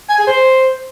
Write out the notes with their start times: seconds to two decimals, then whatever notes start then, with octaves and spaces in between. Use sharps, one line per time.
0.10 G#5
0.18 G#4
0.27 C5